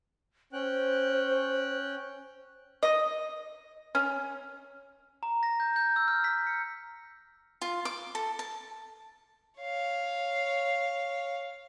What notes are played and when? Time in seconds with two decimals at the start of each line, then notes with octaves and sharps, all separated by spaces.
0.53 C#4 C5 G5 F#6
2.83 D#5
3.95 C#4
5.23 A#5
5.43 A#6
5.60 G6
5.76 G6
5.96 E6
6.08 F6
6.24 B6
6.47 C#7
7.62 F4
7.85 D6
8.15 A4
8.39 A5
9.59 C#5 F5